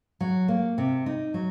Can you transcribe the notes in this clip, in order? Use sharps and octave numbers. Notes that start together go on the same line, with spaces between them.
F#3
A#3
C3
D#4
F#3